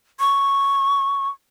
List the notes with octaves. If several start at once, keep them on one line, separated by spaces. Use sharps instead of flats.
C#6